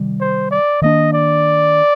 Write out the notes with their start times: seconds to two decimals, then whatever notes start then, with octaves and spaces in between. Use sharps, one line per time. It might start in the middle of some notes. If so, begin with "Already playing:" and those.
Already playing: C3 D#3 G3
0.20 C5
0.51 D5
0.82 D#3 A#3 D4 D#5
1.13 D5